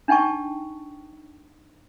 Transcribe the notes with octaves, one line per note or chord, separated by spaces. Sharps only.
D4 D#4 G5 A5 C#6